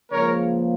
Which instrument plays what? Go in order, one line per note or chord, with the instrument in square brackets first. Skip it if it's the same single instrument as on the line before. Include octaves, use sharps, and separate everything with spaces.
[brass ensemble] C#2 C#3 F3 A#3 A#4 C#5